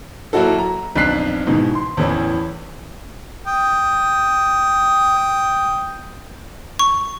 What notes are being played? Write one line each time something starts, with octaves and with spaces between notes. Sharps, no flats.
F#3 A#3 E4 F#4 A4
A#5
B1 F2 D4 F#6 B6 C7
G#2 B2 D#3 E3
C6
E2 A2 E3 C#4
G5 D#6
C#6